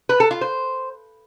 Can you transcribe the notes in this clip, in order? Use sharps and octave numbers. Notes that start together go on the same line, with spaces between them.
B4
A4
F4
C5